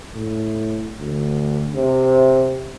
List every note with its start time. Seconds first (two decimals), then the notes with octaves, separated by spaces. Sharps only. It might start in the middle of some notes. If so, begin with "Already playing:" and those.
0.14 A2
0.98 D2
1.75 C3